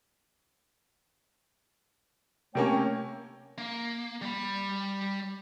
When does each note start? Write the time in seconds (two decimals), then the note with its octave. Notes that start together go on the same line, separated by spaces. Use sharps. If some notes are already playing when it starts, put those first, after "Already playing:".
2.55 C3 A3 A#3 C#4 C#5 G5
3.58 A#3
4.22 G3 B5